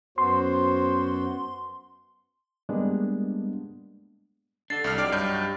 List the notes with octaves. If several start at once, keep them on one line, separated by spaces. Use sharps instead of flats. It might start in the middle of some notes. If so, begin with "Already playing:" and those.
F#2 B3 F#4 C5 C6
G3 G#3 A#3 B3 D4
D4 A4 A6 C7
C2 F6
F#3 D#4 G4 D5 D6 F6
G2 G6